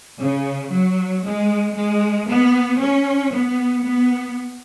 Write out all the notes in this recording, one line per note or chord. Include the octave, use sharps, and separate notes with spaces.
C#3
F#3
G#3
G#3
B3
C#4
B3
B3